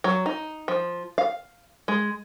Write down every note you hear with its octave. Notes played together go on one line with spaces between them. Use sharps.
F#3
D#4
F3
F5
G#3